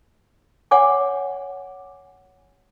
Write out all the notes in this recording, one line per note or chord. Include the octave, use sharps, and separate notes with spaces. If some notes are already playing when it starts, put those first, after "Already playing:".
C#5 F#5 G#5 D6